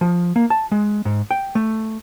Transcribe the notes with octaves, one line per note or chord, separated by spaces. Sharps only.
F3
A#3
A5
G#3
G#2
G5
A3